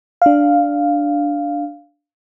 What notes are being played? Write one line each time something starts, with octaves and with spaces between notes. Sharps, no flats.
D4 F5